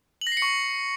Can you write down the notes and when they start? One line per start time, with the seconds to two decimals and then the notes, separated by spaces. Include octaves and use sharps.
0.21 F#7
0.27 A#6
0.32 C7
0.37 C#7
0.42 C#6